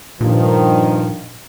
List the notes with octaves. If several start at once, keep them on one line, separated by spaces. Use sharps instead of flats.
G2 A#2 D#3 F3